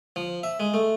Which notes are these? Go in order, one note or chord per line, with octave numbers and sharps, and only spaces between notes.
F3
E5
G#3
A3